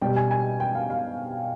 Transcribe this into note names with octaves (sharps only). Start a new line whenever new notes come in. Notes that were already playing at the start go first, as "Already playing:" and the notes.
B2 G3 G5
G#5
G#5
G5
F5
F5